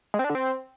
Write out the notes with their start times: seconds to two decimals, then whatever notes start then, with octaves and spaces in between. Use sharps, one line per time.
0.14 G#3
0.19 C4
0.24 D4
0.30 D3
0.35 C4